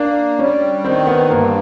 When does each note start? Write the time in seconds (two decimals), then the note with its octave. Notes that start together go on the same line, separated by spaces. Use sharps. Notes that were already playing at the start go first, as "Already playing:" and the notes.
Already playing: A#3 D4
0.39 G3 C#4
0.84 D#3 C4
1.07 B3
1.30 G2 A#3